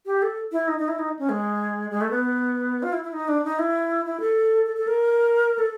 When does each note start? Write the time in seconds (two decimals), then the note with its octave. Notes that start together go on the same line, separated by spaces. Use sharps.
0.06 G4
0.22 A4
0.52 E4
0.68 D#4
0.78 D#4
0.88 E4
0.99 D#4
1.19 C#4
1.29 G#3
1.91 G#3
2.01 A3
2.10 B3
2.83 F4
2.92 E4
3.03 E4
3.13 D#4
3.28 D4
3.44 D#4
3.59 E4
4.05 E4
4.20 A4
4.66 A4
4.76 A4
4.87 A#4
5.59 A4